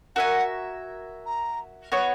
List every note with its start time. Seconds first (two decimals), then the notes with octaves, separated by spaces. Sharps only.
0.16 F#4 A#4 E5 F#5 G#5
1.25 A#5
1.92 B3 F#4 C#5